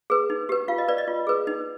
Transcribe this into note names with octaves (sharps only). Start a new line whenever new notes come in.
G#4 B4
D#4
G4 B4
F4 F5
D#5
B4 D5
D#5
F4
G#4 B4
D#4